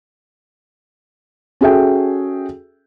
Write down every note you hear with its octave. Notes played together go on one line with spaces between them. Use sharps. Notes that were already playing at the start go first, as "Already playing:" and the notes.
C#4 F#4 G#4 A4 E5 G5